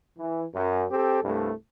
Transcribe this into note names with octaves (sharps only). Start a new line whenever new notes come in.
E3
F#2
C4 G4 A4
C2 G2 A3